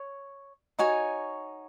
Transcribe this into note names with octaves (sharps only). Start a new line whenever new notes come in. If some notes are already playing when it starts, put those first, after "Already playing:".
Already playing: C#5
D#4 F#4 C#5 G#5